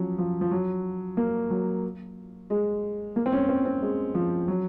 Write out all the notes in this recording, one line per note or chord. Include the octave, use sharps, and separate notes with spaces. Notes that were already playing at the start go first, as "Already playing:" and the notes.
Already playing: F3 F#3 C#4
F3
F3
F#3
A#3
F#3
G#3
A#3
C4
C#4
C4
C4
G#3
F3
F#3